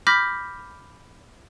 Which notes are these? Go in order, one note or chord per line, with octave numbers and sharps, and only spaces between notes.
B5 D6 F6 G6 A#6 B6